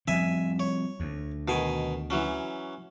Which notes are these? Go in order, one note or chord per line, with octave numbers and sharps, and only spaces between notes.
F3 G3 C4 E5 G#5
C#5
D2
B2 D#3 G#5
E3 F#3 C#4